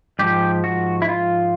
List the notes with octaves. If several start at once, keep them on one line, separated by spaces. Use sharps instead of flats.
G#2 F3 G4
F#4
E4
F4